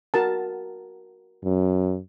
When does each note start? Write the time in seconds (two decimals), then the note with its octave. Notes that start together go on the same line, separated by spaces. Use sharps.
0.14 F#4 A#4 A5
1.44 F#2